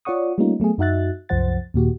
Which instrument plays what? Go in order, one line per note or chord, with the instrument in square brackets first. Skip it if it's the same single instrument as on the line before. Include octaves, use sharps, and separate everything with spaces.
[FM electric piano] F4 C#5 D5 F#5 C#6 D#6
G3 A3 A#3 C#4 D#4 F4
F#3 A3 B3 G#4
F#2 D#4 F#4 E5 F#6 A6
C2 F#2 F3 C5 F#5 A6
D#2 A#2 F#4 G4